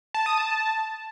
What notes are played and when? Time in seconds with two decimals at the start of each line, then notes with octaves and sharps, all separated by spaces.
0.14 A5
0.26 D#6
0.38 A5